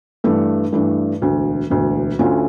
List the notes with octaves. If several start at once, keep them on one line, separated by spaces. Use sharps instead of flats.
G2 E3 A3 D4
G2 E3 A3 D4
E1 D2 D3
E1 D2 D3
D2 D3 A3 C#4 F4